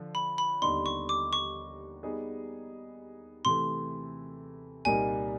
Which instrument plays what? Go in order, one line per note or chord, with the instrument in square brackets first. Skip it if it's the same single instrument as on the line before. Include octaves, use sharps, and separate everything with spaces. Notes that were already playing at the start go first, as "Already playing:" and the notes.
Already playing: [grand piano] D3 F3
[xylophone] B5
B5
[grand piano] D#2 D3 G3 B3 D#4 [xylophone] C6
[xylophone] C#6
D6
C#6
[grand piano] G3 B3 D#4 G#4
[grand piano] C3 E3 A3 [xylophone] C6
[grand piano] C2 A#2 G3 A#3 D#4 [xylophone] G#5